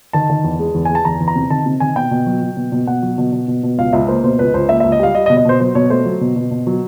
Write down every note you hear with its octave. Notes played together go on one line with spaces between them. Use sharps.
D#3 A5
D#3
E2
G#3
E2
G#3 G#5
A5
E2 A#5
E2
A#5
C3
D#3 A5
C3
D#3 G#5
B2 G5
B2
F#3
F#3
B2
B2
B2 F#5
F#3
B2
B2
B2
B2
C#2 F5
C#2 E5
A#3 C5
B2 C5
C#2 B4
C#2 C5
A#3 E5
C#2 E5
D#5
G3 F5
G3 D#5
D#5
B2
D#5
B2 C5
F#3 C5
B2 C#5
A3 C5
F#3
B2
B2
B2
F#3